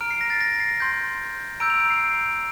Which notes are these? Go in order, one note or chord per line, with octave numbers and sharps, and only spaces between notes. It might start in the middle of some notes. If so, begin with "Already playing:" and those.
A#5 F6 D7
C7
A#6
A6
A#6
C7
C6 G6
A#5 E6 G6 D7
F7
D7
C7